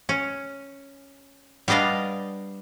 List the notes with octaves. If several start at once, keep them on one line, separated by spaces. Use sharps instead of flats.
C#4
G3 B3 D4 D#5 F5